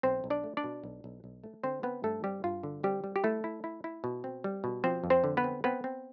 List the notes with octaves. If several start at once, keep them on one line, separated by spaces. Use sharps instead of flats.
B1 C4 C5
B1
D4 D5
A3
D4 D5
B2
B1
B1
B1
A3
D3 C4 C5
B3 C4 B4
G2 A3 A4
G3 C4 G4
G2 F4
D3
G3 C4 G4
G3
G4
A3 E4 A4
E4
E4
E4
B2
C4
G3
B2
F3 C4 C5
F2
C4 C5
D3
B3 B4
C4
B3 C4 B4
C4